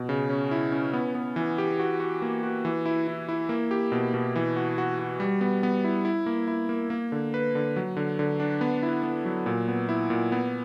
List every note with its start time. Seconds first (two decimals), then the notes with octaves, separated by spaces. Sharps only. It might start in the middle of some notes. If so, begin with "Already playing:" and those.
Already playing: B2
0.09 C#3
0.30 C#4
0.51 E4
0.72 C#4
0.93 B3
1.15 B3
1.36 E3
1.58 G4
1.79 F#4
2.00 F#4
2.22 A#3
2.43 F#4
2.65 E3
2.86 E4
3.08 E4
3.29 E4
3.49 A#3
3.71 G4
3.92 B2
4.14 B2
4.36 E3
4.56 F#4
4.78 F#4
4.99 F#4
5.20 G3
5.41 B3
5.63 B3
5.84 E4
6.05 E4
6.26 A#3
6.48 E4
6.69 A#3
6.90 A#3
7.12 D3
7.34 B4
7.55 D3
7.76 F#3
7.97 D3
8.19 D3
8.40 D4
8.61 B3
8.83 E4
9.03 B3
9.25 F#3
9.46 A#2
9.68 B3
9.89 E4
10.10 A#2
10.32 B3